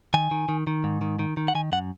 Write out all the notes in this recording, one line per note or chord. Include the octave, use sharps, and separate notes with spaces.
D#3 G#5
D#3
D#3
D#3
G#2
D#3
D#3
D#3
F#5
D#3 G#5
F#2 F#5